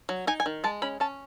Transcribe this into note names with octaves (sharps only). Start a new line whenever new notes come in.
F#3
D#4 G#5
G#5
D#3
G#3 A5
C#4 B5
C#4 A5